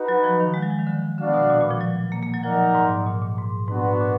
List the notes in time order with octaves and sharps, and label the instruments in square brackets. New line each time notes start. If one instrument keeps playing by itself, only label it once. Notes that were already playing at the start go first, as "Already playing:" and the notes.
Already playing: [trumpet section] D#4 F#4 B4
[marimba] F#3
F3
D#3
G#3
F#3
F3
D#3
D3
[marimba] D3 [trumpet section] B3 D4 F#4 D5 F5
[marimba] B2
A#2
A#2
F3
F#3
A#3
A#3
F#3
[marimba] F3 [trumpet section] D#4 A#4 D5 F#5
[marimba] G#2
A#2
A#2
G#2
[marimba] G#2 [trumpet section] B3 D4 F#4 B4
[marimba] A#2